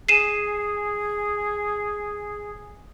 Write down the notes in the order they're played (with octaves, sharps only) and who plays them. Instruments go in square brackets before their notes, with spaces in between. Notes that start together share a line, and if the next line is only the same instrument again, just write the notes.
[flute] G#4 [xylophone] C7 D#7 E7